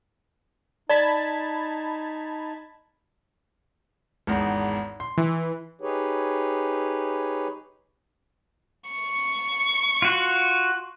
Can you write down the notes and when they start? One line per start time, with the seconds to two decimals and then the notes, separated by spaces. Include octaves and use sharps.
0.90 D#4 D5 A5 B5 G#6
4.27 G#1 E2 G#2
5.00 C6
5.18 E3
5.81 D#4 G4 G#4 B4 C#5
8.90 C#6
10.02 F4 F#4